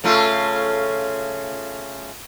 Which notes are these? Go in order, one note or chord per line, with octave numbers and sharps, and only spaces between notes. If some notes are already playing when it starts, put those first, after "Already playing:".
C#3 A3 F4